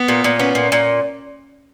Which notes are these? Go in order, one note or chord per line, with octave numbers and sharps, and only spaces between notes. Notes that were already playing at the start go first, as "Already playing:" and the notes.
Already playing: B3
A#2
A#2
B3 C#4
A#2
A#2